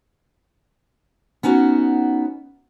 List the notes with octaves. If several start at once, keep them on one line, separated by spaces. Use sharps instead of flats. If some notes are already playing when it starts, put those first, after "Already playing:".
B3 C#4 D#4 F#4